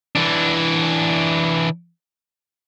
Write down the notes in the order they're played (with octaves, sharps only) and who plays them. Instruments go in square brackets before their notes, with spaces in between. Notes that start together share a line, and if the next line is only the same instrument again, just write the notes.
[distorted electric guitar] E3 D4